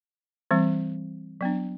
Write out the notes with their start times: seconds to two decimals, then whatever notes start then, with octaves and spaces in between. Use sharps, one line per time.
0.51 E3 G3 C4
1.41 F#3 B3 D4